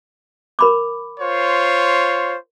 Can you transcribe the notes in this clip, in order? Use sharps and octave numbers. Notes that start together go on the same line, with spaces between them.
A#4 B5 D6
F4 C5 C#5